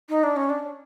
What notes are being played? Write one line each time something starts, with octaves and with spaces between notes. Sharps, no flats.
D#4
D4
C#4
D4